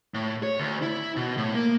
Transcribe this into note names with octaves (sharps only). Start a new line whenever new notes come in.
A2
C#5
D2
E4
B2
A2
A#3